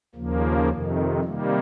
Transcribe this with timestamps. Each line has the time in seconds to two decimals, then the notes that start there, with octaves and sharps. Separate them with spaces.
0.15 D#2 C#3 F3 A#3
0.69 F2 C3 D#3
1.24 C3 D#3 G3 A#3